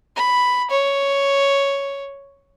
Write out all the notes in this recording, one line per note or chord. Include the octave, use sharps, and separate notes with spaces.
B5
C#5